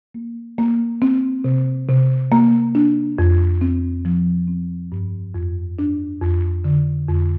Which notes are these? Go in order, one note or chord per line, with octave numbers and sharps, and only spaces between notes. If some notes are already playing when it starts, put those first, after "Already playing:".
A#3
A#3
C4
C3
C3
A#3
D4
F2
C4
F3
C4
G2
F2
D4
F2
D3
F2